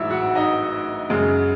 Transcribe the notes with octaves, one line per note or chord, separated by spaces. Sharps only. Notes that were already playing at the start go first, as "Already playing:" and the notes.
Already playing: A1 G#2 F#3 E4 E5
F#4 F#5
D#4 D#5
F#2 C#3 G#3